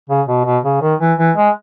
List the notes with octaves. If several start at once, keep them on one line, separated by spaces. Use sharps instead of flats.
C#3
B2
B2
C#3
D#3
E3
E3
G#3